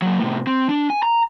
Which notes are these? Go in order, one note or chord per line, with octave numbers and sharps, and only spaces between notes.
F#3 A#3
A2 C3
C4
D4
G#5
A#5